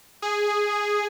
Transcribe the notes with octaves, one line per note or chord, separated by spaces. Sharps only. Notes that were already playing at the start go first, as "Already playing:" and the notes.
G#4